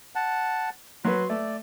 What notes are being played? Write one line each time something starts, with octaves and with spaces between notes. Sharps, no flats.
F#5 A5
F#3 F#4 B4 C6
A3 D5